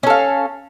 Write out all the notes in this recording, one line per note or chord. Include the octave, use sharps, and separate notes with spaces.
C#4 A4 F5